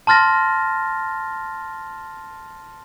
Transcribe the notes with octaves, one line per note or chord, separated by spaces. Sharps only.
A5 C6 F6 A6 A#6